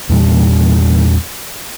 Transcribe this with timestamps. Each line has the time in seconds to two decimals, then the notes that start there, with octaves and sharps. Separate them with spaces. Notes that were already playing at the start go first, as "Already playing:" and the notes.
0.09 E2 A#2 G3